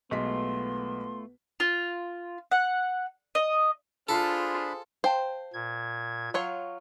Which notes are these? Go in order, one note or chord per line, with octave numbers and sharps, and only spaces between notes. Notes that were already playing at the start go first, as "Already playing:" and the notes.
B1 G#3 A3 B3 F4 C6 B6
F4
F#5
D#5
D4 F4 G#4 A4 C5 B5
C5 F5 G5 A5
A#2 G#6
F#3 F4 C#5